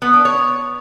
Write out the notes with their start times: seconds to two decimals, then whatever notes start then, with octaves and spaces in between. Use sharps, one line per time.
0.02 B3
0.13 D4
0.25 C#5